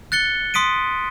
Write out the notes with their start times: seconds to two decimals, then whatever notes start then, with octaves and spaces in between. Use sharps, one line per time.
0.12 F#6 A6 C#7 G7
0.54 C6 D#6 B6 D7 D#7